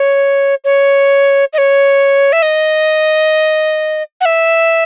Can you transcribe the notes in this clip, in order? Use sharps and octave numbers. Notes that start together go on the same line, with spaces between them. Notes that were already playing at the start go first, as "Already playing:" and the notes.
Already playing: C#5
C#5
D#5
C#5
E5
D#5
F#5
E5